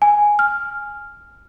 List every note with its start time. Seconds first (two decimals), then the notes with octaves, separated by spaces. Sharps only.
0.02 G#5
0.39 F6